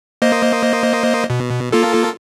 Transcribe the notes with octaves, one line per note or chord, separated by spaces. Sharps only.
A#3 C5 D#5
B2
A#3 F4 A4